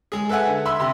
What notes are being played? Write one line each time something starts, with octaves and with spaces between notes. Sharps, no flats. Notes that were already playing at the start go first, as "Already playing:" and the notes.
G#3 G#4
A4 B4 E5 F#5 G#5
D3
E5 B5 C6 E6
C3 G4 E5 C6